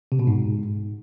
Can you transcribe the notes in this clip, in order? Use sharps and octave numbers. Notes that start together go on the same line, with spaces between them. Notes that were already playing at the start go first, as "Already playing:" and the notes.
C3
B2
G#2